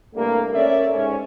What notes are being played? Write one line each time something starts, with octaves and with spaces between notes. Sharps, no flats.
C2 G2 A3 A#3
C#4 A4 A#4 C#5 D5 E5
G#2 C#4